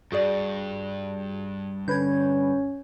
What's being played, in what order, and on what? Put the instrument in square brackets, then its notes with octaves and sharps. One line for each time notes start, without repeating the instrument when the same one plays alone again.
[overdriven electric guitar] G2 [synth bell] F#4 G#4 D5
[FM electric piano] D3 B4 [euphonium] C#4 [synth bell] G6 G#6